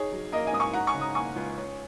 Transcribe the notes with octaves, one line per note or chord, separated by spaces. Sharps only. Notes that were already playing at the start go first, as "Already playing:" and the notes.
Already playing: D#4 G#4 C#5
F#3
A#3 A#4 D#5
D#5 G#5
G#2 D#6
G#5 C#6
D#4 F#5 A#5
G#5 C#6
C#3
A#5 D#6
A#3 G#5 C#6
C#2
C#4